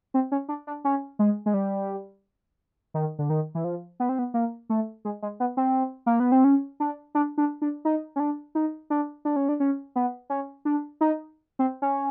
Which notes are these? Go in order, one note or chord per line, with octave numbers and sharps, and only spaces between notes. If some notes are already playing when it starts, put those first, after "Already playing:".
C4
C#4
D4
D4
C#4
G#3
G#3
G3
D#3
D3
D#3
E3
F3
B3
C4
B3
A#3
A3
G#3
G#3
B3
C4
A#3
B3
C4
C#4
D4
D4
D4
D4
D#4
C#4
D4
D#4
D4
D4
C#4
D4
C#4
B3
C#4
D4
D#4
C4
C#4